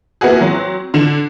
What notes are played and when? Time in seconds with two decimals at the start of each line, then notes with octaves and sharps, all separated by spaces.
0.21 A#3 B3 E4 F#4 G#4
0.41 F#3 C4
0.94 D3 E7